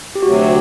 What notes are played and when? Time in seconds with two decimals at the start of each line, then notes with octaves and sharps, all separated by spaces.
0.15 G4
0.23 D2 C3 F#3 F#4
0.37 G4